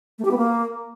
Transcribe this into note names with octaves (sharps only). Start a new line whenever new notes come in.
A3
G4
B3
A#3